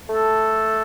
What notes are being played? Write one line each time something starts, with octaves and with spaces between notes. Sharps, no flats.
A3 A4